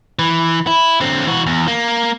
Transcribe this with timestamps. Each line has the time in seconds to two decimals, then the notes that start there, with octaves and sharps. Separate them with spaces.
0.19 E3
0.67 E4
1.00 D3 C4
1.27 E3 F#4
1.46 E2
1.68 A#3